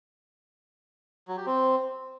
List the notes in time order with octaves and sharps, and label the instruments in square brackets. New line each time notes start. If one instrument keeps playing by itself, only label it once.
[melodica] F#3
G4
C4